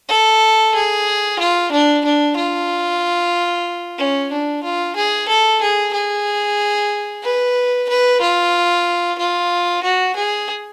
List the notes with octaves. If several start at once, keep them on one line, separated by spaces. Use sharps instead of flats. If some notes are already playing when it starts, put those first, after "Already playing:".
A4
G#4
F4
D4
D4
F4
C#4
D4
F4
G#4
A4
G#4
G#4
B4
B4
F4
F4
F#4
G#4